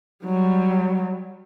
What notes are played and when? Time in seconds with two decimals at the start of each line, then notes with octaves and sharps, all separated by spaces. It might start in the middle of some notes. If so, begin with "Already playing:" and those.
0.25 F#3 G3